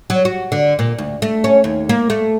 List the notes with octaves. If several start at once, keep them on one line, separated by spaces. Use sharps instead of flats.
F#3
F#4
D3
A#2
D2
A3
C#4
D#2
A#3
A3